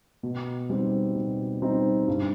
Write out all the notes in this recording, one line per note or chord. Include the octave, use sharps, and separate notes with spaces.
B2
G3 C4 D#4
B2
G3 C4 D#4
G2